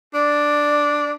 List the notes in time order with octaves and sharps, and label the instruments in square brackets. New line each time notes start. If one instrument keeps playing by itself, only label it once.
[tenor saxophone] D4 [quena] D5